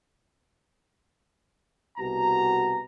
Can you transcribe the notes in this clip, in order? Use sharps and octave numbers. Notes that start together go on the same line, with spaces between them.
C2 B2 F#4 A#5